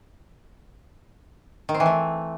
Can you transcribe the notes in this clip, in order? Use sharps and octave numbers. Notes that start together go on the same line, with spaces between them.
D#3
C4
E3
A3